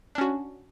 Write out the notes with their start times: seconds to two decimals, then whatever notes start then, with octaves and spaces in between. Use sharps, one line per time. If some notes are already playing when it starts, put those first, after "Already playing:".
0.15 D4
0.18 C#4
0.21 F#4